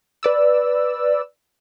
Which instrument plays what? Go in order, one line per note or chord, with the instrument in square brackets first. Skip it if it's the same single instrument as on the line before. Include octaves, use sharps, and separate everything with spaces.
[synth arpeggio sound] B4 D5 E6